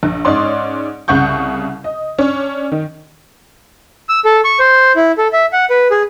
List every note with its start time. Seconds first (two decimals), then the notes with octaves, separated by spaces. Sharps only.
0.03 A#1
0.25 G#2 C#4 D5 D#5 C6
1.08 C2 C#3 F#5 C#6 G6
1.84 D#5
2.18 C#4 D4
2.72 D#3
4.09 E6
4.25 A4
4.44 C#6
4.59 C5
4.96 E4
5.18 A4
5.33 E5
5.53 F#5
5.70 B4
5.91 G#4